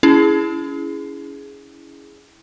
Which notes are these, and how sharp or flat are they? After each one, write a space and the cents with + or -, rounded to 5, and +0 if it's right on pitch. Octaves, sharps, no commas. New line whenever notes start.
C#4 +30 E4 +0 G#4 +0